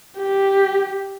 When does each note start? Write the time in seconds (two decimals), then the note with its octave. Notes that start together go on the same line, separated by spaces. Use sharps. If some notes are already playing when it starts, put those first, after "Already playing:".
0.18 G4